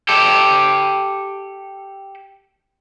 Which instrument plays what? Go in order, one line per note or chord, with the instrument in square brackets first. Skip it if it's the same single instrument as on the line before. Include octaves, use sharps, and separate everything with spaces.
[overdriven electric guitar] G4 A4